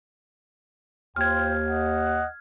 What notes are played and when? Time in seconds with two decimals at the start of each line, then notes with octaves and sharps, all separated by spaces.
1.16 D#2 F4 C5 G5 F6 G#6
1.68 D#5 F#5